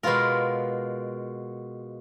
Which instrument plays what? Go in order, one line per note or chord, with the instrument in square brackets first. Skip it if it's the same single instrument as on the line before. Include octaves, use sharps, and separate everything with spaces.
[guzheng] B2 G#3 B3 F4 A#4